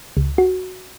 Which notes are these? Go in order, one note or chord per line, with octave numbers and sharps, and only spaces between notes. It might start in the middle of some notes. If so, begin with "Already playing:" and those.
C#2
F#4